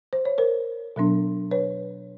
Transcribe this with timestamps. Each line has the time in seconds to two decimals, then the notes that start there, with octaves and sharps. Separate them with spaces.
0.13 C5
0.25 C#5
0.38 A#4 C5
0.96 B2 F#3 B3 D4
1.51 B4 C#5